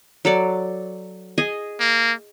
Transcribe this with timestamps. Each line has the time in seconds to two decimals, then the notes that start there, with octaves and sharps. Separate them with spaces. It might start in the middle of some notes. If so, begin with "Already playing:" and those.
0.25 F#3 A4 D5
1.38 G#4 D#5 G#5
1.80 A#3